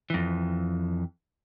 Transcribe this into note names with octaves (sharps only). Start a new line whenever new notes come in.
F2 E3